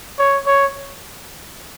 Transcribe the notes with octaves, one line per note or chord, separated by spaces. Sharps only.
C#5
C#5